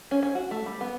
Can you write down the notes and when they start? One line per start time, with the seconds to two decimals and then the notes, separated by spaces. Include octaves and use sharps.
0.11 C#4
0.23 C#4
0.35 F#4
0.51 A3
0.66 G3
0.81 B3